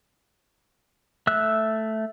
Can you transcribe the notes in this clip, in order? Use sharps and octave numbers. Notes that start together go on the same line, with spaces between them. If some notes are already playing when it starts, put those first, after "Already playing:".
A3 E5 E6 F#6